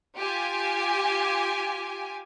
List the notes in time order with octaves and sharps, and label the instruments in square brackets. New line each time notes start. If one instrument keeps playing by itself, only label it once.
[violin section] F4 G4 G#5